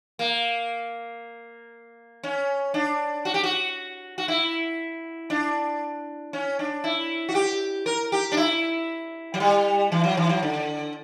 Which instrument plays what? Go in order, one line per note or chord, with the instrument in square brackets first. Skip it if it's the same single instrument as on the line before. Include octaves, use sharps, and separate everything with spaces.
[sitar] A#3
C#4
D4
F#4
G4
F#4
F#4
E4
D4
C#4
D4
E4
F#4
G4
A#4
G4
D4
E4
F#3
G3
E3
F#3
E3
F#3
D3